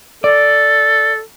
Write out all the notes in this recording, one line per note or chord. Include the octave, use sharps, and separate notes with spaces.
A4 D5